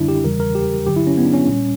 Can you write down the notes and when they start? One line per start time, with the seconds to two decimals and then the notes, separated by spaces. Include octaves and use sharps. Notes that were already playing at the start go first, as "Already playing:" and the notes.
Already playing: F#2 D3 G3 D4 E4
0.08 G4
0.24 E2 C#3 E3 G3 A#4
0.40 A#4
0.55 G4
0.86 G2 D3 F#3 G4
0.96 E4
1.07 C#4
1.18 B3
1.25 D4
1.33 C#4
1.48 A#2 G3